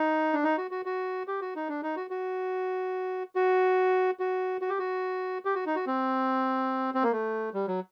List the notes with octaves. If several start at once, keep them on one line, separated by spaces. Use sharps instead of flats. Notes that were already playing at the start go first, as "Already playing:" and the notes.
Already playing: D#4
D4
D#4
F#4
F#4
F#4
G4
F#4
D#4
D4
D#4
F#4
F#4
F#4
F#4
F#4
G4
F#4
G4
F#4
D#4
F#4
C4
C4
A#3
A3
G3
F#3